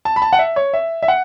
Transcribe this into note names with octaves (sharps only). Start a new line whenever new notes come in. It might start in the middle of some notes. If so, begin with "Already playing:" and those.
A5
B5
A5
F#5
E5
C#5
E5
E5
F#5